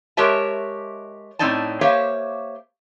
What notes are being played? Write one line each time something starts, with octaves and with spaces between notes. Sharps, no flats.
G#3 G4 A#4 C#5 E5 A5
A2 C4 C#4 D#4 D5 A5
A#3 G4 C5 C#5 E5 F5